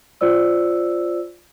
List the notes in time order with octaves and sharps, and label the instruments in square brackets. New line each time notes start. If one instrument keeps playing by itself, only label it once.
[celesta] F4 C5 D5 E6